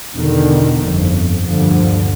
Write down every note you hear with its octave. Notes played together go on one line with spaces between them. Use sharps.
E2 B2 D3 D#3
G1 F2
D2 G2 A#2 D3 F3